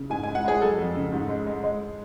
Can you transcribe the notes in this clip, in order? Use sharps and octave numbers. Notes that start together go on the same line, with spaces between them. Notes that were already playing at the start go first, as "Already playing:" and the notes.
Already playing: C#3
G#2 G#5
G#3 G#5
F#5
G#3 G#4
F#3 A4
F2
C#3
G#2
G#3
G#3
G#3